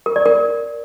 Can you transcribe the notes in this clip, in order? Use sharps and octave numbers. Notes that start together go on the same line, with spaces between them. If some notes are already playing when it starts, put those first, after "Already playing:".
A#4
D5
A#4